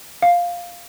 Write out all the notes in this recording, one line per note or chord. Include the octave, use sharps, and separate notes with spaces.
F5